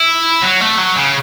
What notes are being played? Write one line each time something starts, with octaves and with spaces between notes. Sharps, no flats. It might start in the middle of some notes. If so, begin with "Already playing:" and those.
Already playing: E4
F#3
A3
F#3
C#3